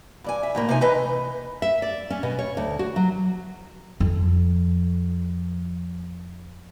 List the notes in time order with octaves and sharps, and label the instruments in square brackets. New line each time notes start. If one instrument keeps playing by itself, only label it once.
[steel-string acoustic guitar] G2 D5 G#5
E5
F2 A2 A#3
C3 F3 D#4 G#5
E3 A3 B4 D#5
[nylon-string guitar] E5
D5
C#4
B2
C#5
D2
F#4
F#3
[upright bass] F2 F3